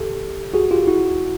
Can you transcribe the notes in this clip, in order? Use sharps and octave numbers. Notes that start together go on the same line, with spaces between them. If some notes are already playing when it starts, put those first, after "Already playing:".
Already playing: G4 A4
F#4 G#4
F4 G4
E4 F#4